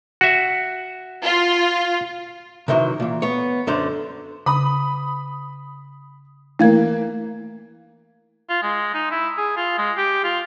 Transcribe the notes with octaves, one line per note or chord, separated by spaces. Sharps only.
F#4 E5
F4
C3 D#3 E3 F#3
A#2 E3
B3 C#5
F#2 D3 C5
C#3 B5 D#6
E3 A3 A#3 F5 G#6
F4
G#3
D#4
E4
G#4
F4
G#3
G4
F4